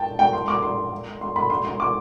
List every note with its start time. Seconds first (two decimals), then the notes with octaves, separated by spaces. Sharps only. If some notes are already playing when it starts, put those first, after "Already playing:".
Already playing: G5 A5
0.19 G5
0.33 C6
0.48 D6
0.63 C6
1.21 C6
1.36 B5
1.50 C6
1.65 C6
1.80 D6